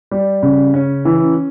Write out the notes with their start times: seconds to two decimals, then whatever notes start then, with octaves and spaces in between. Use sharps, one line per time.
0.11 G3
0.43 C#3
0.74 C#4
1.05 E3